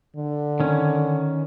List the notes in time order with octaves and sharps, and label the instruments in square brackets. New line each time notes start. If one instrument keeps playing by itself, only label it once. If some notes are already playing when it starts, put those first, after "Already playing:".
[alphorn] D3
[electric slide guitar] D#3 C#4